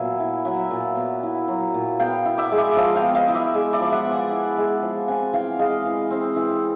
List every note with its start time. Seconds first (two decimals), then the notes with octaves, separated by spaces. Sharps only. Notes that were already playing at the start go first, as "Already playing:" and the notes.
Already playing: A#2 F#3 B3 E5 G#5
0.20 E4
0.45 F#3 E5 F#5
0.71 A#2
0.97 B3
1.23 E4
1.48 F#3
1.74 A#2
1.99 B3 F5 G5
2.25 E4
2.38 D5 E5
2.51 G#3
2.58 D5 E5
2.76 F3 D#5 F5
2.95 F5 G5
3.02 B3
3.15 D#5 F5
3.28 E4
3.35 D5 E5
3.54 G#3
3.73 D5 E5
3.80 F3
3.92 E5 F#5
4.05 B3
4.11 F#5 G#5
4.30 E4
4.57 G#3
4.82 F3
5.08 C4 F#5 G#5
5.33 E3 F5 G5
5.59 G#3 D#5 F5
5.85 E3
6.11 C4
6.36 E3